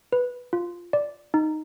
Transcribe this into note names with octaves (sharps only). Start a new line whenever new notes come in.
B4
F4
D5
D#4